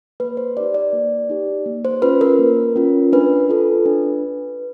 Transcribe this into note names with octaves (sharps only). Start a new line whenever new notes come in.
A#3 B4
C5
D#4 G4 D5
D5
A#3
D#4 G4
A#3
C5
C#4 F4 B4
A#4
A#3
C#4 F4
D4 B4
F4 A4
D4